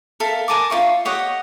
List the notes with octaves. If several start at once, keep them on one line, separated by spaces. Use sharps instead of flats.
A4 A#4 E5 F5
A#4 G#5 A5 D6
F4 C#5 E5 C#6
G4 C#5 D#5 F#5